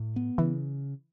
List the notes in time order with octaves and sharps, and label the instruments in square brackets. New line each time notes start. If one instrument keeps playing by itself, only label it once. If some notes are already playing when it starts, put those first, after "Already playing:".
Already playing: [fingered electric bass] A2
B3
[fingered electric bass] C#3 [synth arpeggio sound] E3